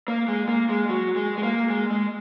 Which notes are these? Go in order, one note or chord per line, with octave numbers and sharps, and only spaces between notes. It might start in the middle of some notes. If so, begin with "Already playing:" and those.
A#3
G#3
A#3
G#3
F#3
G#3
G#3
A#3
G#3
G#3